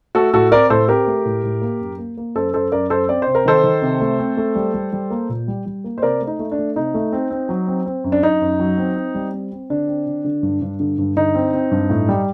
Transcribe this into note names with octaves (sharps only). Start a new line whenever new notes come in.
A3 F#4 A4
A2 F#4 A4
C4 A#4 D5
A2 A4 C5
C4 G4 A#4
A3
A2
A2
A#3
F#2
A#3
A#3
F#2 A4 C5
F#2 A4 C5
F#2 A#4 D5
F#2 A4 C5
C4 D5
C3 C5
A#4
D#3 A4 C5
D#3
C3
A3
C4
A3
G3
G3
G3
A#3
A#2
G3
G3
A#3
C5
C3 A#4 D5
A3
D#4
A3
D4
A3
C3 D#4
A3
C4
C4
F#3
C4
C4
F#2
D4
F#2 D#4
F#2
F#3
C4
C4
G3
C4
C4
D3 D4
C4
D3
D3
G2
G2
D3
G2
D3 D#4
C4
C4
G2
A2
G3